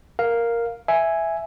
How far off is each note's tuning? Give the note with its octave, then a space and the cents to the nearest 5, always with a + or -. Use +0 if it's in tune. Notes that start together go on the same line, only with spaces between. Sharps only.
A#4 +0 F5 +0
E5 +0 G#5 +0